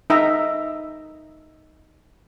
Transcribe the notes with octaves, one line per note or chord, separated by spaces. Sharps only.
D#4 D#5 E5 A#5